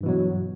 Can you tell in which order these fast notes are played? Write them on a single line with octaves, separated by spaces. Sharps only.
G2 E3 B2 F#3